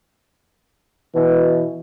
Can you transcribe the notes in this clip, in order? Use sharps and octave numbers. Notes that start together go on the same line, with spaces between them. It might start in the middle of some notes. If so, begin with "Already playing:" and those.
B2 E3